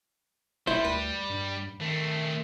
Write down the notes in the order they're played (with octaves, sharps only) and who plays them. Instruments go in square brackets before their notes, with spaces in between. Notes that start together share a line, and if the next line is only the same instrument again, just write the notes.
[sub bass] F1 [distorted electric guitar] G3 [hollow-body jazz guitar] E4 C5
[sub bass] D2 [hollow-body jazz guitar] B4
[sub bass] G2
[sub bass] D#3 [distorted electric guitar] A3 C4